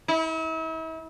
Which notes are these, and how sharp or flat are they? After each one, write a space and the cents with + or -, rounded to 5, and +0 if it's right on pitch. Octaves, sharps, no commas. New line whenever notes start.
E4 -40